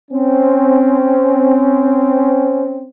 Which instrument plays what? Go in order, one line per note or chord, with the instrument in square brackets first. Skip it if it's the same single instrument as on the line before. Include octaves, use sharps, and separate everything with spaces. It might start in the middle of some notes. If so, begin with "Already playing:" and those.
[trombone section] C4 C#4